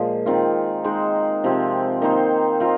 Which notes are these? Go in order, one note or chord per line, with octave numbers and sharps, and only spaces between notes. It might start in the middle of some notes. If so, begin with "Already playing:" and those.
Already playing: A#2 F3 G#3
D#3 C4 F4
G#3 D#4 C5
C3 F3 C4
D#3 A#3 D#4 C5
C4 F4 A#4